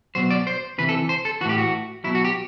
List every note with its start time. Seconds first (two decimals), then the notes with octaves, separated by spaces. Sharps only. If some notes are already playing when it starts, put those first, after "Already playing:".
0.15 B2 F#3 C5
0.31 D5
0.47 C5
0.78 C3 E3 B4
0.89 A4
1.09 C5
1.25 A4
1.41 E3 F#4
1.45 A2 G4
1.58 F#4
2.04 B2 F#3 E4
2.15 F#4
2.25 G4